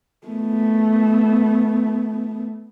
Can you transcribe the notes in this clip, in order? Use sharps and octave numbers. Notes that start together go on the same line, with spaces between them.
A3 B3